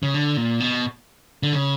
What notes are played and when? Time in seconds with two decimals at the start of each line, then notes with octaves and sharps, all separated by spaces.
0.03 C#3
0.14 D3
0.37 A#2
0.60 B2
1.43 D3
1.53 C#3